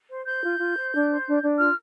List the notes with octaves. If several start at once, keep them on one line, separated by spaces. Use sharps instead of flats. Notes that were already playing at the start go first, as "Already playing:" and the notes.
C5
C5 G6
F4
F4
C5
D4
C5
D4
D4
F4 F6